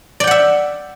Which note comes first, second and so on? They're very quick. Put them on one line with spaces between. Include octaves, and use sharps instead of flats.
D5 G5 F#5 E5